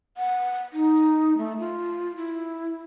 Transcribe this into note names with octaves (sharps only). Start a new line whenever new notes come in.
F#5
D#4
A3
F4
E4